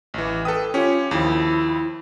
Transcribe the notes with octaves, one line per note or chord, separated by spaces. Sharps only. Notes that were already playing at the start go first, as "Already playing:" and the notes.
A1 E3
A4 B4 G5 D#6
C#4 F4 G4 C#5
D#2 F3 E4